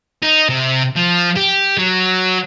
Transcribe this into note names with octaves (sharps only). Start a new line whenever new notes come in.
D#4
C3
F3
G4
F#3